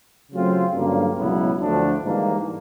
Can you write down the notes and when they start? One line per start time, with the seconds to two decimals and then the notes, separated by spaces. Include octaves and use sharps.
0.32 C#3 F#3 A3 C4 F4
0.74 G2 D3 F#3 A#3 C#4
1.18 C#2 B2 F#3 B3 E4
1.60 D2 D3 F3 A3 D4
2.04 G#2 E3 G3 A#3